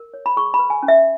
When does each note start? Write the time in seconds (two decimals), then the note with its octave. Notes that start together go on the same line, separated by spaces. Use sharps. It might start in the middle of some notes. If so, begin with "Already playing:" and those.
Already playing: A#4
0.14 C#5
0.26 B5
0.37 G#4 C#6
0.54 B5
0.59 B4
0.70 G#5
0.83 C#4
0.88 E5